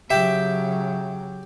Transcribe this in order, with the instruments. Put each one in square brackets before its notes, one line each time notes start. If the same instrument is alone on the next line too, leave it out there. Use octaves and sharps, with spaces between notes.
[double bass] C#3 F#3 [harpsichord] G4 G5 [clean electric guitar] E5